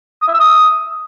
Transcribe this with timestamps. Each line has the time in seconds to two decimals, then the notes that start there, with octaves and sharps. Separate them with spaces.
0.22 D#6
0.28 E5
0.34 E6
0.40 D#6